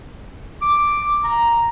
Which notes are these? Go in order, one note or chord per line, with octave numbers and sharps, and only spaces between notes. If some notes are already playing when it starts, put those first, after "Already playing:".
D6
A#5